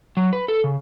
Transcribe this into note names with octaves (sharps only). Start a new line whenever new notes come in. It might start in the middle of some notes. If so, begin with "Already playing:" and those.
F#3
B4
A4
C#3